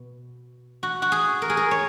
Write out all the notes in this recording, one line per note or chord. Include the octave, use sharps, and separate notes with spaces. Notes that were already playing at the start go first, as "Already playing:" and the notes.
Already playing: B2
F#4
F#4
G#4
A#4
G#4
A#4
C#5